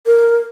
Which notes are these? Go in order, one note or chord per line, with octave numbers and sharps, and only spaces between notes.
A#4